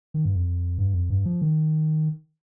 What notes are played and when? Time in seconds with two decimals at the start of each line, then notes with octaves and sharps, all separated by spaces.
0.14 D#3
0.25 G2
0.35 F2
0.78 G2
0.93 F2
1.10 G2
1.25 F3
1.42 D#3